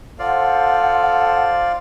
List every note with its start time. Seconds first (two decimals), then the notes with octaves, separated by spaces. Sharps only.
0.19 F4 A4 C5 D5 F5 F#5